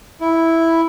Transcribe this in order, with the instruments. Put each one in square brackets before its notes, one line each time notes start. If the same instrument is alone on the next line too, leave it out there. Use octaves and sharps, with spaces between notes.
[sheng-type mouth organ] E4